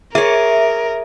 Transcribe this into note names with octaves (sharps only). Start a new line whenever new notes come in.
G#4 A#4 C#5 E5